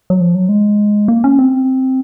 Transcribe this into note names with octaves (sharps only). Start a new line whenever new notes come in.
F#3
F3
F#3
G#3
A#3
C#4
C4